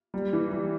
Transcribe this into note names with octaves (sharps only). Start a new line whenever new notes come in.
G3
E3
G3